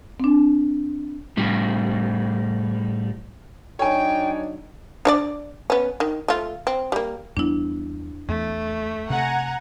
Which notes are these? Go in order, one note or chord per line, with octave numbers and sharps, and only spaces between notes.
C4 D4
A2 G3
F#3 D4 D#4 C#5 G5 G#5
D4 C#5 D5
B3 C#4
D#3
A3 F4
C4
G3 A#3
E2 G3 B3 D4 E4
E2 A3
C3 F#5 G#5 A#5